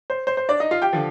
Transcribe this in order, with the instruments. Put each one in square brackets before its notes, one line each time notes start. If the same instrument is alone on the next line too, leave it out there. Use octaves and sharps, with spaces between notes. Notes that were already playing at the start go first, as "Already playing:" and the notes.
[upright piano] C5
C5
C5
D4 D5
D#4 D#5
F4 F5
G4 G5
D3 F3